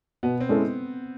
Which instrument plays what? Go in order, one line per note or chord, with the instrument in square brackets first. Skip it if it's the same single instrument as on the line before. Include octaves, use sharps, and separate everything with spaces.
[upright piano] B2 [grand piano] B3
[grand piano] C4
[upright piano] G#3 C#4 E4 A4